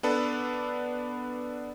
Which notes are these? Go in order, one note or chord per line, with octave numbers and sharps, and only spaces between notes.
B3 D4 A4 B4